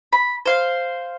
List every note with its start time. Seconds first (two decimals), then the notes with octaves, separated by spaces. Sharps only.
0.13 B5
0.46 C5 F5